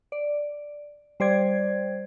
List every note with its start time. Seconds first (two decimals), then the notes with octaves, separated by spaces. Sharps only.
0.12 D5
1.20 G3 C5 D5 G#6